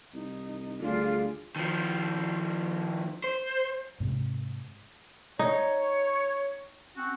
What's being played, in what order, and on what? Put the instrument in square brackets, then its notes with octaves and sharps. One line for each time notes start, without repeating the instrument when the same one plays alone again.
[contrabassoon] C2 [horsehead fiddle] D#4
[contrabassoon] D2 [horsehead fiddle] G3 D4 [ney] F4 [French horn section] G#4
[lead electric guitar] D#3 F3
C5
[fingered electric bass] G#2 C3
[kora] D#4 [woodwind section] C#5
[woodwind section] C4 C#4 F#4